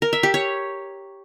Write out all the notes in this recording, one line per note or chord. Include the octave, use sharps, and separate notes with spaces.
A#4
E5
G4
C#5